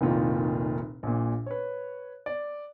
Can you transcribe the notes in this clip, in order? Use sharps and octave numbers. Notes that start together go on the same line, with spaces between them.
F1 C2 A#2 D#3 F4
A#1 A#2
B4 C#5
D5